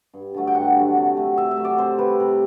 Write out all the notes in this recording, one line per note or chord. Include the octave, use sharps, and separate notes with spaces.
G2
D3 F#3 A3
G5
G2 F#5
D3 F#3 A3
C3
F#3 A3
C3 E5
E5
F#3 A3
D5
C3 C5
G3 B4
C3